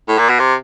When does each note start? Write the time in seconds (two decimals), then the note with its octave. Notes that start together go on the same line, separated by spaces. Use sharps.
0.08 A2
0.19 A#2
0.29 B2
0.39 C3